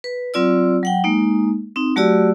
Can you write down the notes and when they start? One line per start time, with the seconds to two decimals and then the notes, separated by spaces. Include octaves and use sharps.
0.04 B4
0.34 F#3 C4 F4 D5 E6
0.83 F#3 F#5 G5
1.04 G#3 A#3 D#4
1.76 C4 D#4
1.96 F#3 A3 F#4 G4 D5 E6